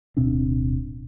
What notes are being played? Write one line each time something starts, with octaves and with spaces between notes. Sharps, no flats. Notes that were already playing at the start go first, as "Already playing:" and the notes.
D1 B2 C4 D4